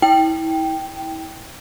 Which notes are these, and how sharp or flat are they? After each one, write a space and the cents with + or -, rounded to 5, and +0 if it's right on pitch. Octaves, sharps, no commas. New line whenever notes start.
E4 -30 G5 +0